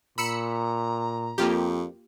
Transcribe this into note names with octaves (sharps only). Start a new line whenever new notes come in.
A#2 A#5 B5 E6 C#7
F2 A#3 F4 G4